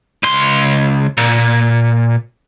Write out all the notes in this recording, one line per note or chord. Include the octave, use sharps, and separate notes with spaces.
C#2 C6
A#2